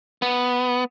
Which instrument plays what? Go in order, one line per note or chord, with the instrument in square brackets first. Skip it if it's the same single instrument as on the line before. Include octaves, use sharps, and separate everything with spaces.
[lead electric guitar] B3